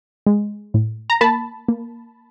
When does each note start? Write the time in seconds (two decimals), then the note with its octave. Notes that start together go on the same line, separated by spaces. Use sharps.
0.27 G#3
0.74 A2
1.10 A#5
1.21 A#3 A5 B5
1.68 A#3